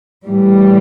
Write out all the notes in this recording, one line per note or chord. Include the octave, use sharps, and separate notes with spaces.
A2 E3 G3